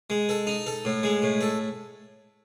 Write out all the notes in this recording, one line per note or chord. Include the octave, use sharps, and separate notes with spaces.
G#3
A4
D#4
A4
A2
G#3
A2
A4